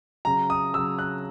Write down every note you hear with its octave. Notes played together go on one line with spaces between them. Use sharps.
C#3 F#3 A#5
D#6
C#3 F#3 E6
F#6